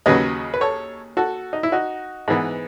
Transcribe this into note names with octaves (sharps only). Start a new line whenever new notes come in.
D#2 C#3 F#3 B4 D#5
B4
A4 C#5
F#4 A4
D#4
E4
D#4 F#4
G#2 E3 B3